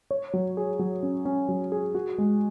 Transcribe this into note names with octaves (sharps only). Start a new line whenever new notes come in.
C#5
F#3
G#4
F#3
C#4
C#4
F#3
G#4
F#4
G#3